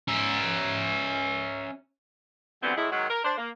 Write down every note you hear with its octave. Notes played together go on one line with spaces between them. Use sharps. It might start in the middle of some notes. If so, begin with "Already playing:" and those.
C#4 E5
D3 E3 F#3 G3 B3 C4
A2 G#3 E4
D#3 F#3 G#3
A#4
D4 C5
A#3